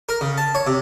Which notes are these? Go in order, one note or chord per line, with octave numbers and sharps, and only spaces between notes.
A#4
C#3
A5
C#5
C3